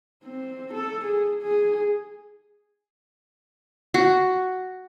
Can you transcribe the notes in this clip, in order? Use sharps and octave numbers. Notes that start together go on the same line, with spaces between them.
C4
A4
G#4
G#4
F#4